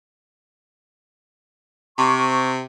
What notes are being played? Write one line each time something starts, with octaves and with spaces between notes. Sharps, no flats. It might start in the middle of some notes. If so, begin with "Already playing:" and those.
C3 C#6